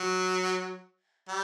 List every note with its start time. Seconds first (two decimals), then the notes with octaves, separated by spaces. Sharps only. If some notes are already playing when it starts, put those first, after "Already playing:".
Already playing: F#3
1.29 G3